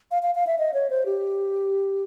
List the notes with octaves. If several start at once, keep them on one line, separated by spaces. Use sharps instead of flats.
F5
F5
F5
E5
D#5
C#5
C5
G4